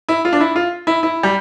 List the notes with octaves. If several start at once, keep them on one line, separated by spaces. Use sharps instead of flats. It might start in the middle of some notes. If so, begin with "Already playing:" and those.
E4
F4
D4
E4
F4
E4
E4
G3